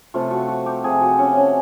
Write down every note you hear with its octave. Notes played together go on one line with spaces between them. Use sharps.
C3 F3 A3 F4
F#4
F#4
G4
C3 F3 A3 G#4
F#4
C#4
C#4